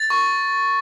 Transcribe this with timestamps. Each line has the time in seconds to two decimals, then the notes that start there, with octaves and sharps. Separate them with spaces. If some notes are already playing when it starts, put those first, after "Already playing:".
Already playing: A6
0.10 C#6